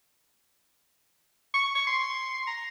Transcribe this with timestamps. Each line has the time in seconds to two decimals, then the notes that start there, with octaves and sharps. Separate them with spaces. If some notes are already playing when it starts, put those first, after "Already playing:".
1.54 C#6
1.75 C#6
1.87 C6
2.47 A#5